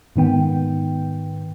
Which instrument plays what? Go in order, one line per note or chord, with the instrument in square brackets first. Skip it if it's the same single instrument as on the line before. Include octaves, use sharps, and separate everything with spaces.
[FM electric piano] G#2 D#3 B3 G5